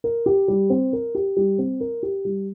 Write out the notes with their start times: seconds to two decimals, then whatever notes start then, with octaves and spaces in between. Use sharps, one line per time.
0.04 A#4
0.26 G4
0.48 G3
0.70 C4
0.93 A#4
1.15 G4
1.37 G3
1.58 C4
1.80 A#4
2.03 G4
2.25 G3